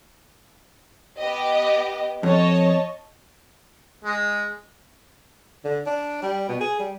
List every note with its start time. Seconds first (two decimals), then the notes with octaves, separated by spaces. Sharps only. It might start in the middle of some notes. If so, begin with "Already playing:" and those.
1.18 B3 G4 D#5
2.23 F2 C#5 D#5 A5
4.04 G#3
5.65 D3
5.86 D4
6.22 G3
6.49 B2
6.60 G#4
6.80 G3